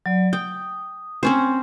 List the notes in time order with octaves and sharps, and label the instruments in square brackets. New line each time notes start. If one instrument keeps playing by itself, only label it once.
[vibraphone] F#3 D5
[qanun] G5 [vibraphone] D#6
[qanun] C4 C#4 C5